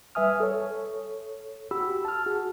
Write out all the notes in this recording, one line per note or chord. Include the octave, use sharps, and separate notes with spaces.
G3 B4 E5 G#5 D#6 F6
A4 C#5
F#4 G4 B5 E6
A5 F6
F#4 G#4